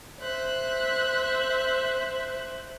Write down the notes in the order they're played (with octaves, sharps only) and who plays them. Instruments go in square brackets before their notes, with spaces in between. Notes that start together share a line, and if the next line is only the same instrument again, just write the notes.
[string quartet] C5 E5 F#6